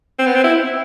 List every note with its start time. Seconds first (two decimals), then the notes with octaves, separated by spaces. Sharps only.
0.19 C4
0.27 B3
0.35 C4
0.44 E4